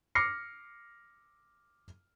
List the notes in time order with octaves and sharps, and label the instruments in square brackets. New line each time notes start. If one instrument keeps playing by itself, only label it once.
[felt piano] D6 F6 A#6 C7 C#7